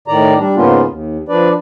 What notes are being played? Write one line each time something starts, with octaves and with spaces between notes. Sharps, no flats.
A2 D#3 D5 A#5
G3 D4
G#2 C#3 A#3 B3 C#4 F4
D#2
F3 D4 B4 D5